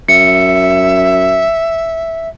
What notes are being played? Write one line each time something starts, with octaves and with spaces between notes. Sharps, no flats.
F#2 E5 C#7